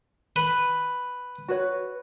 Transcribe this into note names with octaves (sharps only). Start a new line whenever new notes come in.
B4
F#4 B4 C#5